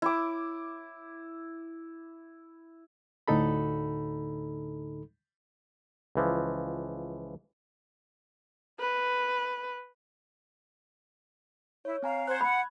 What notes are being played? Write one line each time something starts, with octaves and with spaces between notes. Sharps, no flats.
E4 D6
D2 A2 D3 D#4 A4 B5
C#2 E3 F3
B4
E4 C#5
C4 F5 G#5 A#5
C5 F#5 F#6 G#6
F#5 B5